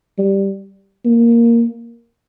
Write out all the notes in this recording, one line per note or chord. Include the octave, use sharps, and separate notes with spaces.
G3
A#3